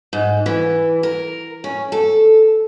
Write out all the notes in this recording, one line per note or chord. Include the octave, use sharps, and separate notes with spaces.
G#2
E3
A#4
C#4
A4